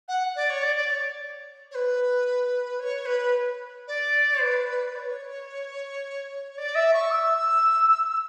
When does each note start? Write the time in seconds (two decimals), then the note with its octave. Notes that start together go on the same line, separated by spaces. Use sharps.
0.08 F#5
0.36 D5
0.49 C#5
0.62 D5
0.76 D5
0.89 C#5
1.71 C#5
1.74 B4
2.79 C#5
3.05 B4
3.87 D5
4.41 B4
4.95 D5
4.98 C#5
6.57 D5
6.75 E5
6.93 C#6
7.10 E6